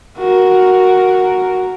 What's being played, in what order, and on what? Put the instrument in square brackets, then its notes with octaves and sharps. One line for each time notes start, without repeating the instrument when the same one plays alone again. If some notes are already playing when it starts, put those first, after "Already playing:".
[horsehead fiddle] F#4 A#4